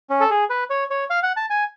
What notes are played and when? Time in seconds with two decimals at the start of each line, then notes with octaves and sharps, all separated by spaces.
0.10 C#4
0.20 A4
0.30 G#4
0.50 B4
0.70 C#5
0.90 C#5
1.10 F5
1.23 F#5
1.37 A5
1.50 G#5